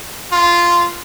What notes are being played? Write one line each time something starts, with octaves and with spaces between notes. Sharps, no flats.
F4